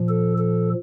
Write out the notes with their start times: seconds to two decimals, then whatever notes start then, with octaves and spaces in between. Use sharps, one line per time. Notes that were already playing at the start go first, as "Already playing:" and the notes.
Already playing: A#2 F3
0.09 A4
0.38 A4